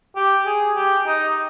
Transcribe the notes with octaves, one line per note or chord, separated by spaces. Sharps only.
G4
G#4
G4
D#4